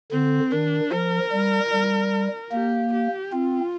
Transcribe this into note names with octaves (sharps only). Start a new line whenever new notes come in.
D3 C4
D#3 D4
F3 A#4
G3
G3
A#3 G4
G4
C4 F4